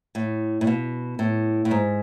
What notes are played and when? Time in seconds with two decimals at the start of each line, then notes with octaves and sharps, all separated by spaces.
0.15 A2
0.61 A2
0.67 B2
1.19 A2
1.65 A2
1.71 G#2